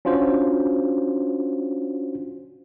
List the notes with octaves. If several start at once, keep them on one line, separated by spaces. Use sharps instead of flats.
C#4 D4 F4 F#4 C5